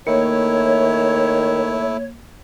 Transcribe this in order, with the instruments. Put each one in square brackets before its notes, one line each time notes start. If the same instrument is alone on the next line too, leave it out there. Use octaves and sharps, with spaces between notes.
[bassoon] D#3 [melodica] A3 E4 [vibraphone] A#3 [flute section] C#5